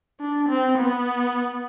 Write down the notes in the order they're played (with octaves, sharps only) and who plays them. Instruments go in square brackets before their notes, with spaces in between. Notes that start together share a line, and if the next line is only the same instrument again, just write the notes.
[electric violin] D4
C4
B3